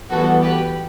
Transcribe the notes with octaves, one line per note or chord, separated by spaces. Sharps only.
E3 G3 B3 F#4 A4
G4 B4